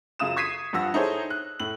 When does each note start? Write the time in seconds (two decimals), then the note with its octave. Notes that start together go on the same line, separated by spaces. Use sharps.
0.19 F#2 C#3 F4 D#6 E7
0.36 C#6 G#6 B6 C7 D#7
0.73 G2 F3 F#5 E6 A#6
0.94 D#4 E4 G#4 A4 C5 C#5
1.30 F#6
1.60 A2 F#7